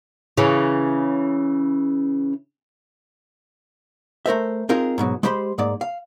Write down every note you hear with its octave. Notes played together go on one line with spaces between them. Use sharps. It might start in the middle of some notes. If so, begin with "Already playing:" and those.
C#3 E3
A3 A#4 C5 E5
C4 D#4 F4 G#4 A#4
G#2 B2 F#3
G#3 G4 C5 B5 C6
G#2 G#3 A#3 D5
F5